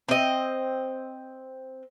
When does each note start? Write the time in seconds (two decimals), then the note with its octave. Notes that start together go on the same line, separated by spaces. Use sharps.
0.09 C4 D#5